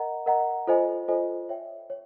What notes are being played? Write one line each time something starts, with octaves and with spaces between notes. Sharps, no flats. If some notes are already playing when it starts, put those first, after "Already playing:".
Already playing: A#4 D#5 F#5 A#5
A#4 D#5 F#5 A#5
F4 A4 C5 D#5 G#5
F4 A4 C5 D#5 G#5
C#5 E5 G5
C#5